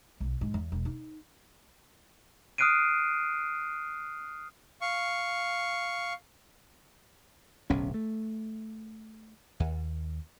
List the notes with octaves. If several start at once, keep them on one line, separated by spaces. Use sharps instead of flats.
B1
G#2
E2
E1
D#4
D#6 F6 F#6 C7 D7 D#7
F5 C#6
D1 B1 C#4
A3
D#2